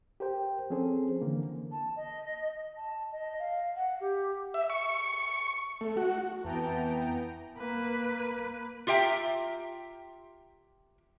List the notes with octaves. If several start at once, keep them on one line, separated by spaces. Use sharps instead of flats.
G4 A#4 C5 G5
F3 C4 C#4 G#4 A4 C5
D3 E3 A#3
A5
D#5
A5
D#5
F5
F#5
G4
E5
C#6
A3
F#4
F2 E3 B3 G5 A5 A#5
A#3 B4
F4 G4 E5 G5 A#5